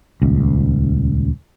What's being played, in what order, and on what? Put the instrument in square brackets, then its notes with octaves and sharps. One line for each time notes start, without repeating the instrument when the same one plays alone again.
[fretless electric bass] D#1 C#2